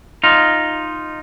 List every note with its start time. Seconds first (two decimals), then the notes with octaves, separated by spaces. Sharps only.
0.24 D#4 F4